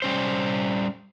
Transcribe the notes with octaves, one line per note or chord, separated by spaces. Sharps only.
G3 C#4 C5